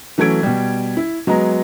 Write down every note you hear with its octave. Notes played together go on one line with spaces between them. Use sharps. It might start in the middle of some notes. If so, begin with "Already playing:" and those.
E3 F#3 A3 C#4 G#6 D7
B2 G3
E4
F#3 G#3 B3 A#5